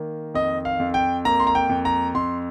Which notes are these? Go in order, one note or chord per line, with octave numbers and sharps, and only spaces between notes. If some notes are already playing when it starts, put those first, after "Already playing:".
Already playing: D#3 A#3
F2 D#5
F5
F2
G5
A#3 A#5
C6
A#5
G5
F2
A#5
F2 C6